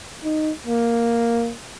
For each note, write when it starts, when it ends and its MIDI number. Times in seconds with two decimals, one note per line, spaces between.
0.24 0.51 63
0.66 1.52 58